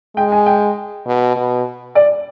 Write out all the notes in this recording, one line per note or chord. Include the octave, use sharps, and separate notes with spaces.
G#3 G5
G#5
G5
B2
B2
D5